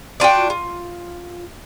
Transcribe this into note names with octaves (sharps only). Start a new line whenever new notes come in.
D4 F4 F#4 G5
F4